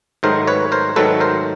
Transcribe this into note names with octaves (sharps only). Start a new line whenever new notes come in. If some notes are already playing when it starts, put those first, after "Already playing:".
G#2 D#3 F#3 A3 A#4 C5
B4 C#5
A#4 C5
G#2 D#3 F#3 A3 A4 B4
A#4 C5